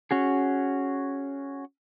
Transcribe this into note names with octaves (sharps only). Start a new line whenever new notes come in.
C#4 F#4 G#4